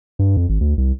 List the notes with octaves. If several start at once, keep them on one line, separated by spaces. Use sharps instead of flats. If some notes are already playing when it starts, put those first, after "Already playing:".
G2
F2
G#1
D2
C2